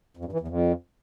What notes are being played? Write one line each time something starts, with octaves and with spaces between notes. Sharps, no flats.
F2
G2
E3
E2
F2